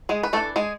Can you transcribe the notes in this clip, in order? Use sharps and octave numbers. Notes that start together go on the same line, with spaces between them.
G#3 G#4
B4
E3 A3 D4 A4
G#3 G#4